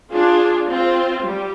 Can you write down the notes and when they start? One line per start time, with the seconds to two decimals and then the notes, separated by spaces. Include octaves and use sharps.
0.12 D4 F4 G#4
0.68 C4 F4 C5
1.24 G3